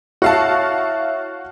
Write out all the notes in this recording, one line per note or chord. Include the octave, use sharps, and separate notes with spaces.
E4 F#4 C#5 E5 F5 A5